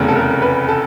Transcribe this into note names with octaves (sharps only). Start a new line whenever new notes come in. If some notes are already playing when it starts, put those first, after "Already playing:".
Already playing: F1 E2 C#3
A4
A#4
B4
A4